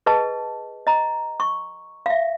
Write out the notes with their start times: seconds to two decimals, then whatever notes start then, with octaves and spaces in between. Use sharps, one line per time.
0.06 G#4 B4 D#5 A5
0.87 D#5 A#5
1.40 C#6
2.06 E5 F5